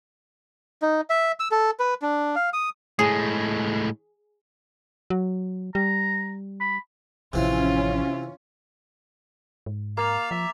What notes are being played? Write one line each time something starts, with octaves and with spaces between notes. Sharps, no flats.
D#4
E5
E6
A4
B4
D4
F5
D#6
A2 G#3 G#4
F#3
G3 A#5
B5
A1 C3 E3 F3 C#4 F4
G#2
A#3 F5 D6 A6 F7
F3 E5